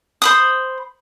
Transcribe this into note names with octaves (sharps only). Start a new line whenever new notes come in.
C5 B5 D#6